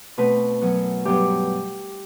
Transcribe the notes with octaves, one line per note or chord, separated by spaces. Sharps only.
B2 A3 C4 B4
F#2 F#3 B3
G2 F#3 B3 G4